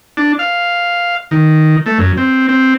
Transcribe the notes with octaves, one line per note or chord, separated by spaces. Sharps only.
D4
F5
D#3
A3
F#2
C4
C4